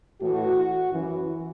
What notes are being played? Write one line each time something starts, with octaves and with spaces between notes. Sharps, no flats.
A2 E3 F#4
F#2 E3